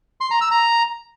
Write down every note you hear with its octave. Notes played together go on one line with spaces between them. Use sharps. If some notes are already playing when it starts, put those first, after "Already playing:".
C6
A#5
E6
A#5